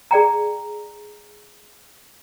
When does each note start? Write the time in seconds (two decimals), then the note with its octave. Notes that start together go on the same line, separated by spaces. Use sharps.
0.11 G#4 D5 G5 A#5